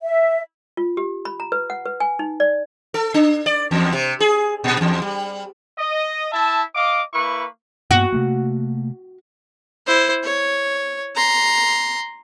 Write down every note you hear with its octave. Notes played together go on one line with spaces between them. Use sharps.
E5
F4
G4
B5
A#5
B4
F#5
B4
G#5
D#4
D5
A4
D4
D5
E2
C3
G#4
A#2
E2
G3
D#5
E4 E5 A5
D#5 F5 D6
A#3 E4 B4 C#6
G2 A#3 B3 F#4
C3 A3 A#3
E4 C5
C#5
A#5 C6